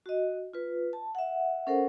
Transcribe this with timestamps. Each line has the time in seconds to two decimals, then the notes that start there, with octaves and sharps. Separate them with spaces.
0.06 F#4 D#5
0.54 F4 B4
0.93 A5
1.15 E5 F#5
1.67 C#4 A4 A#4 C5 F#5